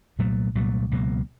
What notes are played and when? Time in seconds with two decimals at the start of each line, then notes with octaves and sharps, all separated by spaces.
0.19 C2 A#2 F#3 A3
0.55 C2 A#2 F#3 A3
0.91 C#2 B2 F#3 A#3